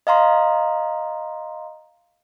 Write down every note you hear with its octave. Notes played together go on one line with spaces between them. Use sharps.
D#5 F5 A#5 C6